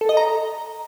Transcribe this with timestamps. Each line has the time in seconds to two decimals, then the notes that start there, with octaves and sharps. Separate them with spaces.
0.01 A4
0.09 D#5
0.17 A#5